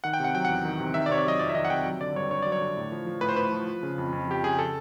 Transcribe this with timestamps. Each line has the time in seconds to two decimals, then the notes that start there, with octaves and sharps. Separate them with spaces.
0.04 D#3 F#5
0.13 G5
0.20 C3 F#5
0.35 F#3 G5
0.45 E2 F#5
0.65 D#3
0.80 C3
0.94 D#3 E5
1.06 D5
1.09 C3 C#5
1.17 D5
1.25 F#3 D#5
1.39 F2 D5
1.49 E5
1.55 D#3 D#5
1.65 F#5
1.70 C3 G5
1.85 F#3
2.01 D3 D5
2.15 G2 C#5
2.31 G2 C#5
2.42 F#3 D5
2.52 C#5
2.61 D3
2.77 A2
2.92 F3
3.07 F3
3.21 A2 B4
3.29 C5
3.36 A2 B4
3.52 F3
3.68 F3
3.83 C#3
3.98 F2
4.13 F2
4.27 F3 G4
4.43 C#3 G#4
4.59 A4